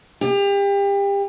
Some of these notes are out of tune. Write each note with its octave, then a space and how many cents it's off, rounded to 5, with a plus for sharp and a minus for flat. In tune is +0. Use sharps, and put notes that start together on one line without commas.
G4 +30